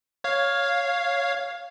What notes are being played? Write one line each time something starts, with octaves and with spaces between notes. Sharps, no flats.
C#5 F5